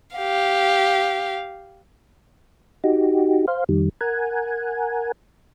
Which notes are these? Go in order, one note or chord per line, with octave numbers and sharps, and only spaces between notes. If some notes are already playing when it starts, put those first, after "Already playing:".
G4 F5
D#4 F#4 G4
C5 F5
F2 D#3 G3
A#4 F#5 G#5